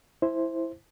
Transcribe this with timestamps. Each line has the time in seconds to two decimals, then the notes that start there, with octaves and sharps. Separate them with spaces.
0.22 E4 C5